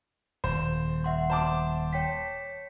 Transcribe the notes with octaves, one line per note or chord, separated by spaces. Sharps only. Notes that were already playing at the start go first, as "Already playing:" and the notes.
D#1 C5
E5 F#5 C6
C5 A5 D6
C#5 G5 B6